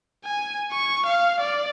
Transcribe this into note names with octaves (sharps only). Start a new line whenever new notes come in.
G#5
C#6
F5
D5